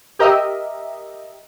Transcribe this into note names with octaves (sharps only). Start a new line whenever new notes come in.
G4 A#4 D#5 E5